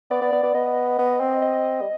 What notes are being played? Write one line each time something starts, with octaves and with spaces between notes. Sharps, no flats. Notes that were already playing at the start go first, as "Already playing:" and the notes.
B3 D5
B3
B3
B3
B3 D#5
B3
C4
D#5
G3